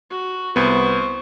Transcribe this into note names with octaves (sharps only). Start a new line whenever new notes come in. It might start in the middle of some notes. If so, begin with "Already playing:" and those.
F#4
C2 B3 C5 C#6